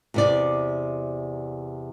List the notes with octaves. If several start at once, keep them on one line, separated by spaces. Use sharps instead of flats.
E2 C3 D5